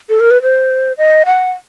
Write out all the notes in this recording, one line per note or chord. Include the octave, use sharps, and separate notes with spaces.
A4
A#4
B4
C5
D#5
F#5